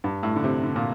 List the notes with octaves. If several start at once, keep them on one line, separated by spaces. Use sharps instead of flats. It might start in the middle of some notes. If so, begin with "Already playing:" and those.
G2
A2
D3
C3
D3
A#2